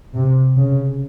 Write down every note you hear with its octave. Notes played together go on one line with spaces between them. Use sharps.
C3
C#3